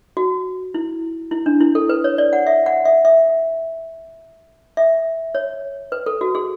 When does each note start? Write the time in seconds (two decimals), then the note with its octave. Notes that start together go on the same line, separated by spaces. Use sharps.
0.17 F#4
0.74 E4
1.31 E4
1.46 D4
1.61 E4
1.75 A4
1.89 B4
2.04 C#5
2.18 D5
2.33 F#5
2.47 E5
2.66 F#5
2.85 E5
3.05 E5
4.77 E5
5.35 C#5
5.92 B4
6.06 A4
6.21 F#4
6.35 G#4